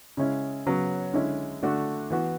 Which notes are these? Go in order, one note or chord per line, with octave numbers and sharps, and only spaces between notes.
C#3 G#3 C#4 E4
C#3 F#3 B3 F#4
D3 G#3 C#4 E4
D3 A3 D4 F#4
E3 B3 F#4